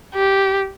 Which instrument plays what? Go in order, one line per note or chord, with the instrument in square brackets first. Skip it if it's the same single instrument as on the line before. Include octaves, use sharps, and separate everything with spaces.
[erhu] G4